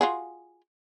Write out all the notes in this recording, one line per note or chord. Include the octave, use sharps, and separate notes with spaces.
F4 F#4 G#4